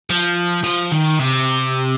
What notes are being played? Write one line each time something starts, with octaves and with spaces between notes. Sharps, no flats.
F3
F3
D#3
C3